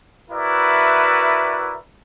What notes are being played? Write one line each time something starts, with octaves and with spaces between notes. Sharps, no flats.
E4 F#4 A#4 B4 D5 E5